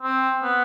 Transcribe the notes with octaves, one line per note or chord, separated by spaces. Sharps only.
C4
B3